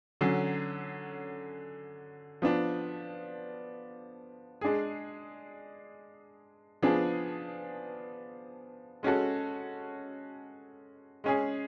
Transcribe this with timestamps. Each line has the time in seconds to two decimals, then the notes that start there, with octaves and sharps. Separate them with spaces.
0.21 D3 F#3 C#4
2.42 F3 B3 D4
4.61 G#3 D4 G#4
6.83 F3 B3 D4 G#4
9.03 G#3 C#4 F#4 A4
11.24 G#3 C#4 G#4